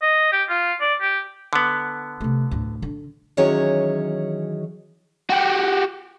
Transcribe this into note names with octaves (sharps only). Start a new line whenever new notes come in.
D#5
G4
F4
D5
G4
D3 B3
C3 A3
D2 A2
D3 D#4
D#3 E3 F#3 C#4 G#4 C#5
F#4 G4